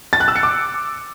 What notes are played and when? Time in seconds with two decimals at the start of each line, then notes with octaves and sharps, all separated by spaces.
0.13 A6
0.20 F#6
0.28 E6
0.36 C#7
0.43 D6